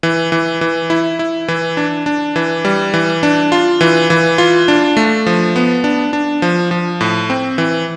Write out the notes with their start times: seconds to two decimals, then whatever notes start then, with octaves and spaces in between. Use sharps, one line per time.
0.03 E3
0.32 E3
0.61 E3
0.90 E4
1.19 E4
1.48 E3
1.77 D4
2.06 D4
2.36 E3
2.65 G3
2.94 E3
3.23 D4
3.52 F4
3.81 E3
4.10 E3
4.38 F4
4.68 D4
4.97 A3
5.27 F3
5.56 B3
5.84 D4
6.13 D4
6.42 F3
6.71 F3
7.01 A2
7.30 C4
7.58 E3